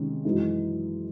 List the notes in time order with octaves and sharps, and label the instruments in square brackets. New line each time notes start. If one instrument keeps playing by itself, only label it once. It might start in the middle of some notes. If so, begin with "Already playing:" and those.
Already playing: [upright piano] C3 D#3 G#3 C#4
F#2 E3 G#3 D#4